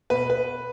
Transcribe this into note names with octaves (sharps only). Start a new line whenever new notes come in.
B2 B4
B4